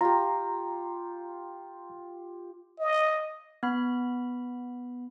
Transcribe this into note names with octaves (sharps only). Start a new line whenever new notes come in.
F4 G4 A#5
D#5
B3 B5